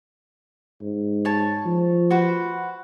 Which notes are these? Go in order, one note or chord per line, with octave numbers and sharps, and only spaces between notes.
G#2
C#5 A5
F3
F#4 B4 C5